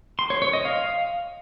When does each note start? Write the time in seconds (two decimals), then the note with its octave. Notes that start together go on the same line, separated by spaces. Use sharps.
0.19 C6
0.30 C#5
0.42 C#5
0.53 D#5
0.65 F5